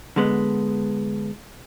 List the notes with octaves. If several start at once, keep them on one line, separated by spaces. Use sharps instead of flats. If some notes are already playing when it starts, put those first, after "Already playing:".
D3 G#3 B3